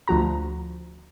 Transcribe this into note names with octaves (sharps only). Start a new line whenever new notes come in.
D2 F3 F#4 A#5